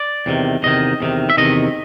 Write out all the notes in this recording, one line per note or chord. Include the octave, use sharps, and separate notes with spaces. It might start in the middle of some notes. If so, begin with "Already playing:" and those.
Already playing: D5
E2 C3 D#3
E2 C3 D#3 D#5
E2 C3 D#3
E5
E2 C3 D#3 D#5